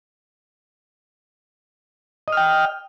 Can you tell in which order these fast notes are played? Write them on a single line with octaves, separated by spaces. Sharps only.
D#5 F6 G5